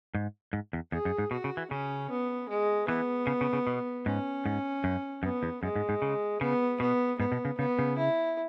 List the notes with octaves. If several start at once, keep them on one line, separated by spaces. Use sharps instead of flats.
G#2
G#2
E2
E2 G#4
F#2
G#2
B2 F#4
C#3
E3
C#3 C#4
B3
G#3
E3 B3
C#3
C#3
C#3
B2
G#2 C#4
G#2
F#2
F#2 B3
E2
F#2 G#3
G#2
G#2
C#3
C#3 B3
B2 B3
G#2 B3
B2
C#3
C#3 B3
C#3
E4